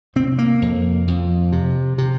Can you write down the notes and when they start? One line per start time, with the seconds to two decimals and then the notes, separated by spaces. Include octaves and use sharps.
0.16 C3 C4
0.38 A#3
0.62 F2
1.08 F2
1.52 C3
1.98 C3